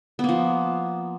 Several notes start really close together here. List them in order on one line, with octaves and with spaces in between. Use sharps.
B3 A#3 F3